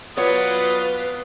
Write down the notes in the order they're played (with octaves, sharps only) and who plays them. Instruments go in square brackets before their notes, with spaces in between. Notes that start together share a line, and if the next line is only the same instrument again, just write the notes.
[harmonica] F#3 D5 D#6 [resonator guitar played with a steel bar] B3 C#5 [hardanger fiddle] F4 [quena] B4